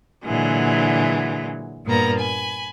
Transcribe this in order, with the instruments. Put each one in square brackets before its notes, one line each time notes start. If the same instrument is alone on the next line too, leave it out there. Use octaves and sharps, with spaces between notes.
[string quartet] A#2 D3 E3 F#3 G#3
G2 A#2 A#3 B3 A#5
G#5 B5